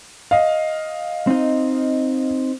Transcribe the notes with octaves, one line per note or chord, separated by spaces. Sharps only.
D#5 F5
C4 D#4